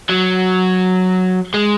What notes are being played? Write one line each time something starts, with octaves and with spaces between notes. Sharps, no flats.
F#3
G#3